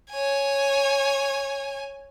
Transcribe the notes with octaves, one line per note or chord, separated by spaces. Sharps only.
C#5 G#5